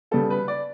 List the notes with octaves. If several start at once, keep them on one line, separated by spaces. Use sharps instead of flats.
C#3 G3 B3 A4
B4
D5